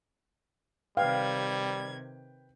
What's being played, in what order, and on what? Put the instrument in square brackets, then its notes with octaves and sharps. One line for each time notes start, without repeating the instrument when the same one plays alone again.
[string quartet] C3 D#3 G#6 [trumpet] G3 [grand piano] B4 G5 [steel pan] F5